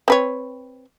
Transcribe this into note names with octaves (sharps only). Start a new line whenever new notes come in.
C4 B4 C#5